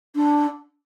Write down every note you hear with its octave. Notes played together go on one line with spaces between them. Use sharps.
D4